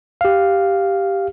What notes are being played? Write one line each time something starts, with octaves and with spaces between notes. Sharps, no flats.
G4 F5